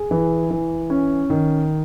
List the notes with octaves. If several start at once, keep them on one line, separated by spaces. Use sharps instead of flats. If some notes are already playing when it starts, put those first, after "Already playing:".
Already playing: G#4
E3
E3
C#4
D#3